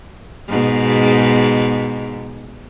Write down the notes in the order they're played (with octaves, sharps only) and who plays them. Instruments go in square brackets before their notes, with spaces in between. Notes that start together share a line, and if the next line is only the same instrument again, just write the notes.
[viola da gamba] G#2 B2